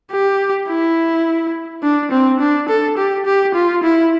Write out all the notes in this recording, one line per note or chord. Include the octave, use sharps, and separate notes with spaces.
G4
E4
D4
C4
D4
A4
G4
G4
F4
E4